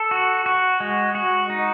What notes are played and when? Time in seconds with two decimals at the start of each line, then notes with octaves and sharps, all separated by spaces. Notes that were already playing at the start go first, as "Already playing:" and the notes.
Already playing: A4
0.11 F#4
0.46 F#4
0.80 G#3
1.15 F#4
1.50 D#4